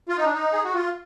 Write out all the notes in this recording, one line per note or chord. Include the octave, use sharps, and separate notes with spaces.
F4
D#4
D4
D#4
G#4
F#4
F4